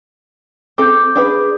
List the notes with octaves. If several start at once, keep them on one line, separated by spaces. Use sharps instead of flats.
C4 A4 D6 G6
D4 G#4 B4